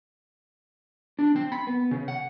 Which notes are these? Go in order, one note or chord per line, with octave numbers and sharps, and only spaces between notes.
D4
C4
B5
B3
C#3
F#5